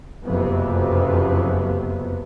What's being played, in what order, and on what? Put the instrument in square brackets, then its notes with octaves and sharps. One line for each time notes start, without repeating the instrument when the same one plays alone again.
[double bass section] F#1 F2 C3 B3